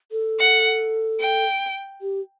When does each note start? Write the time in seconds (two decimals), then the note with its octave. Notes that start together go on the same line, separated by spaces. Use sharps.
0.11 A4
0.39 F#5
1.20 G5
2.01 G4